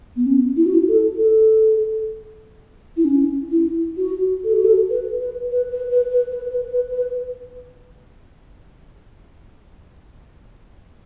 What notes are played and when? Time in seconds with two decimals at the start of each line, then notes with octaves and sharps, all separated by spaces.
0.16 B3
0.26 C#4
0.57 E4
0.66 F#4
0.74 E4
0.88 A4
1.19 A4
2.97 E4
3.05 C#4
3.51 E4
3.97 F#4
4.44 A4
4.54 F#4
4.65 A4
4.90 B4
5.20 B4
5.52 B4
5.72 B4
5.91 B4
6.11 B4
6.31 B4
6.51 B4
6.70 B4
6.91 B4